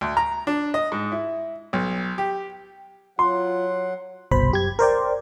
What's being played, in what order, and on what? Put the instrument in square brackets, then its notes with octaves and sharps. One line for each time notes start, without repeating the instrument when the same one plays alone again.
[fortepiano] D2
A#5
D4
D#5
G#2
E4
B1
G4
[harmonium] F#3 F#5 [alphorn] F4 [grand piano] C6
[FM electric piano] G1 C2 B2 C5 B5
F#2 G4 G#6
A#4 C5 D5 G5